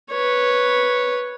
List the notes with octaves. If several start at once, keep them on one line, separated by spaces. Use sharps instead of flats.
B4 C#5